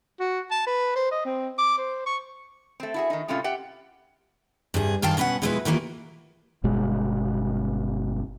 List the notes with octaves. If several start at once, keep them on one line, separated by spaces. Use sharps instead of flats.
F#4
A5
B4
C5
D#5
C4
D6
C5
C#6
A3 C4
E4 F#4 G#4
D#3 D#4
A2 C3 G#3 A3 C#4 F4
G4 E5 F#5 G5
G2 C3 G#4
F#2 D#3 F5 G5 A5
B2 C#4 B4 C5 F#5
B2 F3 G#3 E4 F#4 B4
D#3 E3 G3 A#3 F4
G1 B2 G#3